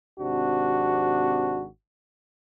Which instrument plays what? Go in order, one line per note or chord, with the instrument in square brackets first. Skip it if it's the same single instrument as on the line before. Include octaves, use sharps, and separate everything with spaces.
[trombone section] G#1 C3 D4 F#4